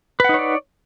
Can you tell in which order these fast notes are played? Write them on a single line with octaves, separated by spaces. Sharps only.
B4 F#5 D#4 C#5 D5